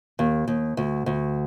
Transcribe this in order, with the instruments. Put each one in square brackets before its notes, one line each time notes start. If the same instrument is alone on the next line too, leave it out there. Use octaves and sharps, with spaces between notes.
[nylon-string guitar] D#2
D#2
D2
D2